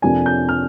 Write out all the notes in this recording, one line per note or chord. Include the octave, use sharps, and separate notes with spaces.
F2 C3 F3 A#3 D4 G#5
G6
F6